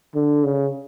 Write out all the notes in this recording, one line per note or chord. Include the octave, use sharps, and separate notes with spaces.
D3
C#3